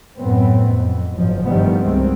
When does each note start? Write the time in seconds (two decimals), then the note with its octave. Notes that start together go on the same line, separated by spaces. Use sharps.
0.19 F#2 A2 B3 C4
0.67 F2
1.16 F#1 G#2 F3
1.45 G2 D#3 F3 G3 A3 B3
1.82 C2 D#3 G#3 C4